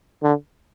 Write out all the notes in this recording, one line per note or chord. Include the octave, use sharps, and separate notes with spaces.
D3